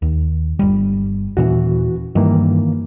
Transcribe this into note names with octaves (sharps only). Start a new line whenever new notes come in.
D#2
G1 G3
D#1 A#2 E3 C#4 F#4
G2 D#3 E3 A#3